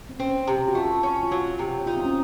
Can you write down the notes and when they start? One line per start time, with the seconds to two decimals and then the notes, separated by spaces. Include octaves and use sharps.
0.09 C4
0.20 C4 C#4
0.48 C3
0.68 F#4
0.75 A3 F4
1.03 C#4
1.23 F4
1.31 F#3 F#4
1.59 C3
1.86 D#4 F4
1.97 C4
2.05 C#4